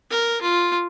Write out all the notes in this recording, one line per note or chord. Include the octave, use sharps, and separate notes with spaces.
A#4
F4